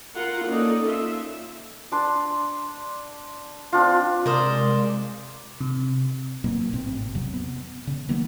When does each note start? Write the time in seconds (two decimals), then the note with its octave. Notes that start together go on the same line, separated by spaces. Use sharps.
0.16 F4 A#4 F#5
0.45 A#3 C#4 D#4 A4 D5 D#5
0.87 F4 E5
1.92 D4 D5 C6
3.73 C4 D4 F4
4.26 C3 G#3 A#4 C5 D5 F5 D#6
5.61 C3
6.44 B2 F#3 A#3
6.73 A1 G#2 B2 C4
7.15 E2 C3 F#3
7.33 B3
7.87 C#3
8.09 D#3 F#3 A#3 B3